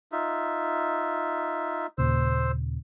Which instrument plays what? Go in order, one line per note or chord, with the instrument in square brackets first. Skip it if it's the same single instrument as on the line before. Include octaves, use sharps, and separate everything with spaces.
[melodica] D#4 F4 E5
[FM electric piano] D#2 A#2 C#3 [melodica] C5 E6